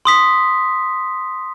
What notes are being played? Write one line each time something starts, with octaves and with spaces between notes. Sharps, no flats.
C6 D#6 B6